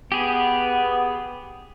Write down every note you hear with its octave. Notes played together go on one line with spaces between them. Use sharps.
B3 G4 G#4